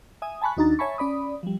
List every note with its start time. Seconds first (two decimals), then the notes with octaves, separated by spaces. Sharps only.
0.22 E5 G#5 D#6
0.42 G#5 A5 B5 C#6 F#6
0.57 D#2 D4 D#4 F#4 A#5 A6
0.79 C#5 E5 G#5 A5 B5 C#6
0.98 C#4 D5 B5 D#6
1.43 F3 G3